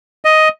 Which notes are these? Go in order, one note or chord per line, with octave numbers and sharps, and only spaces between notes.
D#5